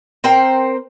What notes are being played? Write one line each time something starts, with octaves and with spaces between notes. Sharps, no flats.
C4 A#4 C5 G5